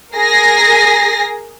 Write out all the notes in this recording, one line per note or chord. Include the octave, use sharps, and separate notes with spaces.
G#4 A#4 A#6 C7